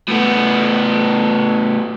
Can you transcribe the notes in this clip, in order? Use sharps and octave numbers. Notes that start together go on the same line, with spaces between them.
A2 B3